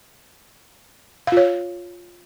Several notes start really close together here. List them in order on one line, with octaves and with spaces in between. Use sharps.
F5 F4 C#5